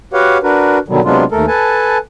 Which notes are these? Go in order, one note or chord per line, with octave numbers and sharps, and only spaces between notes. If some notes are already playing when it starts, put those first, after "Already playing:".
F#4 G4 B4 C#5 F5 F#5
D4 F#4 A#4 B4
B2 D3 D#3 F#3 G3
C3 F#3 G#3 B3 D4 F4
D#2 A3 A4 A#4
A4 B4 G#5 A5